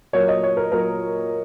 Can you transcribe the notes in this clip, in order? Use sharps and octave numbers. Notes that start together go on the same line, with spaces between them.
A#2 F#3 A#3 C#5
D#5
C#5
A#4
A#2 F#3 A#3 A#4